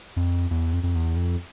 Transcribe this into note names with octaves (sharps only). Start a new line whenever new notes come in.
F2
E2
F2
F2
E2
F2